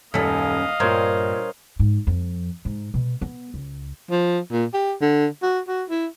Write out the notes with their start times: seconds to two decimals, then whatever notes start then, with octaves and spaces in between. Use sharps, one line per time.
0.14 D#1 F#2 C#4 A4 D#5 F5 B6
0.80 G2 A#2 A#4 C5 C#5 G#6
1.79 G#2
2.07 F2
2.65 G#2
2.94 B2
3.21 B3
3.54 C#2
4.10 F3
4.52 A#2
4.74 G4
5.02 D3
5.43 F#4
5.68 F#4
5.89 E4